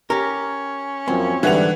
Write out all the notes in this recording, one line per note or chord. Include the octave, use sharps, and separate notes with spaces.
C#4 G4 A#4
F#2 F3 A#3 C4
G#2 D3 E3 G3 F#5 F7